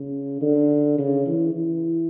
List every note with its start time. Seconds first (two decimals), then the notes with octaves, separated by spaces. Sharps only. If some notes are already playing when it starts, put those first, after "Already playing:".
Already playing: C#3
0.42 D3
0.98 C#3
1.27 E3
1.54 E3